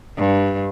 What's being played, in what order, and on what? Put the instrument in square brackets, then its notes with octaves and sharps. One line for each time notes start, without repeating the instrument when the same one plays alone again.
[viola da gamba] G2